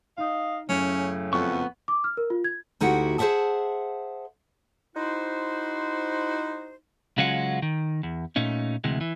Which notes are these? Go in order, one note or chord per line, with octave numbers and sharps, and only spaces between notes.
D#4 D#5 F5
F#2 A2 C#3 C#4
F2 B3 C#6
D6
F6
A#4
F4
G#6
D2 D#4 E4 F#4 G4 F#5
G#4 C5 D#5 E5 F#5 A5
D#4 E4 F#4 C5
C#3 F#3 G#3 C#4 F4 F#4
D#3
E2
A#2 A3 C#4 D#4
D2 C3 E3 G#3
E3